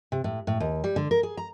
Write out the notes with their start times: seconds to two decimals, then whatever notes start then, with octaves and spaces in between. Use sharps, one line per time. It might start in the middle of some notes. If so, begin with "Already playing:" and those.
0.12 C3
0.24 A2
0.47 A2
0.60 D#2
0.84 G3
0.96 D3
1.11 A#4
1.23 G#4
1.37 A#5